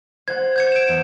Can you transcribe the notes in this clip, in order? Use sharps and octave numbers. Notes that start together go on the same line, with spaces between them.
C5 F#5 G#6
G6 G#6 C#7
D7 E7
E2